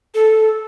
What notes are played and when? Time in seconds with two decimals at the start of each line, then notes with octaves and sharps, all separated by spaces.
0.15 A4